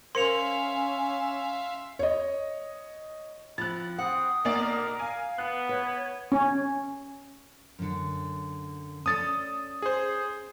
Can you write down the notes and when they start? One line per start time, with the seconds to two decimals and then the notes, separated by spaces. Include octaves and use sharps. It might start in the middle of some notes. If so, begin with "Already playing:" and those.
0.15 C#4 A#4 C5 E5 F5 C6 C#7 F7
1.99 C#5 D#5
3.58 F3 C4 B5 F#6 A6
3.98 C4 F#5 D#6
4.45 B1 A#3 A#4 D5
5.00 F5 G#5
5.38 B3 F#6
5.69 B4 C#5
6.32 C#4
7.79 F#2 D3
9.06 C#4 A4 D5 D#6 A6
9.82 G#4 C5